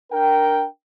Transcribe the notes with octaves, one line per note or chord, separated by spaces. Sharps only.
D4 A#4 G5